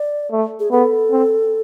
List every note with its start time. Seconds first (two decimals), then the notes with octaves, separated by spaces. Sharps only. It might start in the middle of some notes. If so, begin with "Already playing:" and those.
Already playing: D5
0.32 A3
0.60 G#4
0.71 B3 A4
1.11 C4